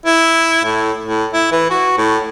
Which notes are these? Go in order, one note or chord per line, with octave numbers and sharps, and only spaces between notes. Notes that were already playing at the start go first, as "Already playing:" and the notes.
E4
A2
A2
E4
E3
F#4
A2